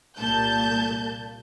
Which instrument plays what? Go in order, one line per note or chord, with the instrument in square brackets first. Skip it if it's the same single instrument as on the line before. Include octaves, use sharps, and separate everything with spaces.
[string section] C2 A#2 A#3 A5 G6